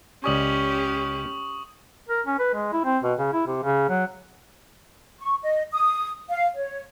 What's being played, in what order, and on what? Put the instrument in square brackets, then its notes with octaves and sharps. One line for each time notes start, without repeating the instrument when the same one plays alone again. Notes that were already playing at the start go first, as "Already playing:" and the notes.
[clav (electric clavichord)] C#2 D5 G#5 [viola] C#4 G4 [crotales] C#6 D#6 F#7
[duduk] A#4
C#4
B4
G#3
E4
C4
B2
C#3
E4
C3
C#3
F#3
[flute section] C#6
D#5
D#6
F5
C#5